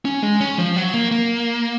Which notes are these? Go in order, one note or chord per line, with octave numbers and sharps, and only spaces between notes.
C#4
G#3
C#4
F3
F#3
A#3
A#3